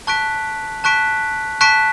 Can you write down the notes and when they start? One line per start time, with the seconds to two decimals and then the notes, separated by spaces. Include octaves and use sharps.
0.07 A5 C#6 F#6 B6 D7
0.84 A5 C#6 F#6 B6 D7
1.61 A5 C#6 F#6 B6 D7